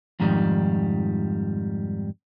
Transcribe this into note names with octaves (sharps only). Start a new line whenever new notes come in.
F2 G#2 D#3 F3 G3